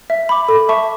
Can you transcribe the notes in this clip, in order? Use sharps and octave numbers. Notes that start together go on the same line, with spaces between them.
E5
B5 D6
A4
E5 A5 C#6